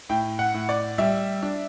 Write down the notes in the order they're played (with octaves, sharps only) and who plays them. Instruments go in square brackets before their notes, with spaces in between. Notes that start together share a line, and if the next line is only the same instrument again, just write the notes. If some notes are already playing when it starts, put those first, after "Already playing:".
[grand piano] A2 G5
F#5
A2
D5
G3 E5
D4